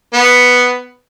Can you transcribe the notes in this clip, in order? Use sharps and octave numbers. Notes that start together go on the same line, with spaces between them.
B3